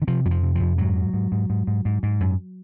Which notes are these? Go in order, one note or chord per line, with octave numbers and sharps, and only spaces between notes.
D#3
C3 F3
F2 F#3
F3
C3
F2 F3
G#2 F#3
G#2
G#2
G#2
G#2
G#2
G#2
G#2
F#2